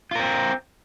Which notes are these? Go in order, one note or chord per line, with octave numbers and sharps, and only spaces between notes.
C4 F4 A#4